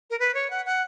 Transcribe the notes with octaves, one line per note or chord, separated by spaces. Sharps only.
A#4
B4
C#5
F#5
F#5